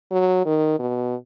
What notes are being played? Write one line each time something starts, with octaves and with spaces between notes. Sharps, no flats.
F#3
D#3
B2